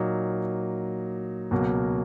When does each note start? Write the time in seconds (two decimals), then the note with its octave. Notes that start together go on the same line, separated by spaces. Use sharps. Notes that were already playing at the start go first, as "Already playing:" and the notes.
Already playing: A#2 F#3 A#3 D#4
1.51 C#2 B2 F#3 A#3